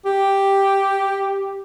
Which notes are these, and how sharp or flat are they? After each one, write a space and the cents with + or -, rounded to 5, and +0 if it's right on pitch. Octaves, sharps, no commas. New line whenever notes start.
G4 +0